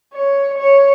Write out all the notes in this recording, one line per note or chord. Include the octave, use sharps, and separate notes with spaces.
C#5
C#5